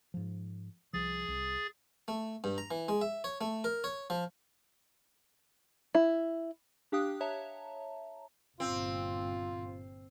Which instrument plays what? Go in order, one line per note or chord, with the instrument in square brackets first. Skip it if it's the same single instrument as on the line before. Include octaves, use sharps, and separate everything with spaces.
[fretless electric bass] G#2 F3
[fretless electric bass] C2 F3 [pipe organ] G#4 A6
[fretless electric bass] C2
[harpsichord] A3
G2
A#5
E3
G#3
E5
C#5
A3
A#4
C#5
F3
[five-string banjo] E4
[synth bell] D4 G4 F5 G5 D#6 F#6
C#5 E5 A5 A#5
[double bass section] G1 A#2 [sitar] C4 [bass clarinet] F4